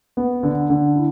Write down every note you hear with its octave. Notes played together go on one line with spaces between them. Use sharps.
B3
D3
D3
E4